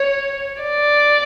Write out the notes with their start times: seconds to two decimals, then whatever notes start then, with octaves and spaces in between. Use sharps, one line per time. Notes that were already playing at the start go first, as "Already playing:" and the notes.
Already playing: C#5
0.62 D5